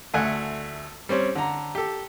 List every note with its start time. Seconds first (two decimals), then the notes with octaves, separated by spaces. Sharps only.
0.14 D2 A3 F#5 G#5 F#6
1.09 G3 C4 C#4
1.35 D3 A#5
1.75 G4 A4